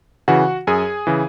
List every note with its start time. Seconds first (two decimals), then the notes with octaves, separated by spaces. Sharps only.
0.28 C#3 E3 F#4 F#5
0.67 F#2 G#4 G#5
1.07 C#3 E3